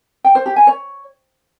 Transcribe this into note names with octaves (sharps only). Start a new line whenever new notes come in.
G5
C5
G4
G#5
C#5